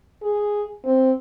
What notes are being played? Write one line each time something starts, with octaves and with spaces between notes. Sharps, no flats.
G#4
C4